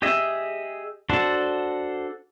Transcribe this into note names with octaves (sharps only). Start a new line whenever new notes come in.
G4 G#4 D#5 E5
D4 F#4 A4 C5 A5